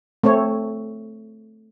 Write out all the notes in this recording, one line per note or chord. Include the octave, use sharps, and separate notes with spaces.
A3 C4 A4 C#5